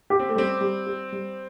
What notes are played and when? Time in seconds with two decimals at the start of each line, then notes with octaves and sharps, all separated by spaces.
0.10 G4
0.19 C4
0.29 A3
0.36 G3 C4
0.61 G3
0.87 G4
1.12 G3